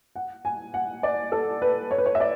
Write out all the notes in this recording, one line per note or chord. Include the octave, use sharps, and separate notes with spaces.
F#5
G#5
F#5
D5
A4
B4
C#5
B4
C#5
E5
D5